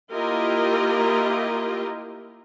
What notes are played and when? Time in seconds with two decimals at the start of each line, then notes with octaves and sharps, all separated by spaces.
0.12 A#3 E4 F4 G4 A#4 D#5